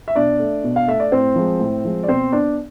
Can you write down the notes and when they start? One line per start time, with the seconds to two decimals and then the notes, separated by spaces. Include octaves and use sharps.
0.08 E5
0.15 B2 D4 D5
0.39 A3
0.64 B2
0.76 F5
0.88 A3 E5
1.00 D5
1.11 A2 C4 C5
1.36 F3 G#3
1.60 A2
1.85 F3 G#3
2.03 D5
2.08 B2 C4 C5
2.32 B3 D4 D5